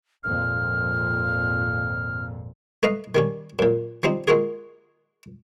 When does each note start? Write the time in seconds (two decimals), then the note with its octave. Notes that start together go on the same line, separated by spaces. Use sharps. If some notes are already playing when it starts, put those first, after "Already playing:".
0.23 G#1 F2 A#2 F6
2.83 A3 B4 D#5 F5
3.15 D#3 G3 C#4
3.59 F#2 A#2
4.03 F3 G3 C4 D#4
4.28 G#3 A#3 F4 F#4 G#4